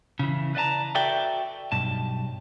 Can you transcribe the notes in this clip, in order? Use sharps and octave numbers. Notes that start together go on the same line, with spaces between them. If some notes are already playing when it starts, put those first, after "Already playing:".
C#3 E3
B4 D5 D#5 A5 A#5
F#4 A4 B4 D5 E5 G5
B1 G2 A5